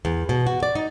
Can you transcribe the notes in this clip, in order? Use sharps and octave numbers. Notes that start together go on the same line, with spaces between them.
E2
B2
F#4
D5
D#4